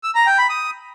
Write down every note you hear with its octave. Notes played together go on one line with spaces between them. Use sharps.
E6
A#5
G5
B5
D#6